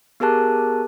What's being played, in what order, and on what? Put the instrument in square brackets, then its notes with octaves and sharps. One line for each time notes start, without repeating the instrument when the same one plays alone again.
[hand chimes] B3 G4 G#4 A#4 A5 F#6